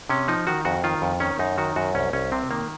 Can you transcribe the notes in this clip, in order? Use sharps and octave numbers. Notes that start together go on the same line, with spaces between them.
C3 C#4
F3 D#4
D#3 F#4
F2 F#4
D#3 F4
F2
D#3 C#4
F#2 D#4
D#3 F#4
F#2 F#4
C2 C#4
C2 C#4
C3 C4
D#3 A#3